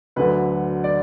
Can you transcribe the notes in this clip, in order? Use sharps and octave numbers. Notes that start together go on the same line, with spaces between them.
D2 D3 F#3 B4
D5